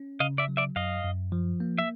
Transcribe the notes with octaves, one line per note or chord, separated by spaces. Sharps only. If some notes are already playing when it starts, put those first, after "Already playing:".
Already playing: C#4
C#3 D#5 F5
D5 E5
F#3
D5 E5
F#2 D#5 F5
F#2
F3
A#3
E5